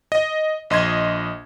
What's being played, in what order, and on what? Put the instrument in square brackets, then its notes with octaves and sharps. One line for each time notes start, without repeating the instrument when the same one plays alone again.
[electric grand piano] D#5
A#1 D#5 C6 G#6